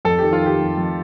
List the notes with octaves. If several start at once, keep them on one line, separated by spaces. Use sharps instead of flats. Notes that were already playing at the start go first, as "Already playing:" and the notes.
F2 A4
D#3 G4
F4
D#3 G4
F2
F2